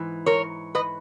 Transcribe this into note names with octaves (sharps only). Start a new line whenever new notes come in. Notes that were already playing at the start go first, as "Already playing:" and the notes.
Already playing: G#2 E3
A#4 C#5
B4 D#5